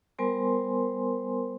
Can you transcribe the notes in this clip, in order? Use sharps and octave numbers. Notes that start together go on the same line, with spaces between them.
G3 B3 A#4 C5 G#5 C6